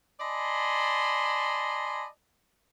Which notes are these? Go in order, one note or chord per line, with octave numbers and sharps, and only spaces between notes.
D5 D#5 G#5 A5 B5 C6